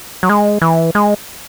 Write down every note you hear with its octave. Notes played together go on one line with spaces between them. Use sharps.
F#3
G#3
E3
G#3